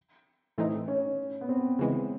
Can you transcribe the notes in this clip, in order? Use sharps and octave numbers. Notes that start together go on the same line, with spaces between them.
A2 E3 A3 C4 D#4
C#4
B3
C4
C#3 E3 G#3